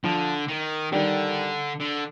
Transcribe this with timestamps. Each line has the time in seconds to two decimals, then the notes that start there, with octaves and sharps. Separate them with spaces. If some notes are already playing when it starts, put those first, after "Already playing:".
0.04 D3 F3
0.48 D#3
0.92 D3 D#3 G3
1.80 D3